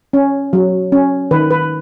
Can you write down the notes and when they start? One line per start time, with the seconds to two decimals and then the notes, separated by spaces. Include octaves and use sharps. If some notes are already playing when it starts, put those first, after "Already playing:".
0.13 C#4
0.53 F#3
0.92 C#4
1.31 D#3 B4
1.51 B4